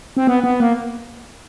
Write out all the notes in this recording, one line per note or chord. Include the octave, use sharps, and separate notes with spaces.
C4
B3
B3
A#3